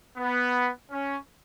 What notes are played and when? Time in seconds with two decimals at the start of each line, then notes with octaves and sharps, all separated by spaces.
0.17 B3
0.91 C#4